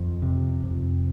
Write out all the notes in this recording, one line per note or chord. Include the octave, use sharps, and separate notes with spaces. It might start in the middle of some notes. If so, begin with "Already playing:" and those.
Already playing: F2
C3
F2